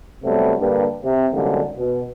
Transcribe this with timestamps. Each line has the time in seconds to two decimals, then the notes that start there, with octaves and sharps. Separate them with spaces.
0.24 C3 F#3 G3 A3 B3
0.60 G2 D3 A#3 D4 G4 B4
1.03 C3 C4
1.32 C2 F#2 D3 G3 G#3 A#3
1.78 B2